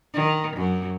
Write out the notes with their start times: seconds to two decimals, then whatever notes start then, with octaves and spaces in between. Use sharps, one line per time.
0.14 D#3
0.56 F#2